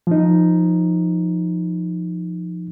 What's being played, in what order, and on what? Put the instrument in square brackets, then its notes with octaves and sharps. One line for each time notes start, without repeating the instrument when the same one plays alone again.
[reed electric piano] F3 D#4